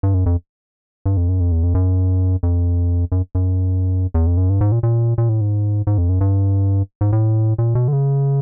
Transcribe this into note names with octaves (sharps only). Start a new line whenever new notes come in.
G2
F#2
F2
G2
F2
F#2
F2
E2
F2
F#2
F2
F#2
F#2
E2
F2
F#2
G2
G#2
A#2
A#2
A#2
A2
G#2
G#2
F2
F#2
G2
G#2
A2
A#2
B2
D3
C#3